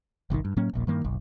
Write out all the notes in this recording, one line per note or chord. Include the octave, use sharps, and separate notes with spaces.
G1 C2 B2 D#3
G2
A2 F#3 A#3 C#4
D#1 A#1 A#2
G2 D#3 A#3
F#1 B1